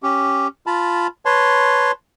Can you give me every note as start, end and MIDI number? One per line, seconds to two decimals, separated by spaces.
0.03 0.47 61
0.03 0.47 67
0.66 1.07 65
0.66 1.07 81
0.66 1.07 83
1.25 1.91 71
1.25 1.91 73
1.25 1.91 81
1.25 1.91 84